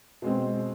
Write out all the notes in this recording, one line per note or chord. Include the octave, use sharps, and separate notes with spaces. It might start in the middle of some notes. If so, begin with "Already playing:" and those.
B2 G#3 C4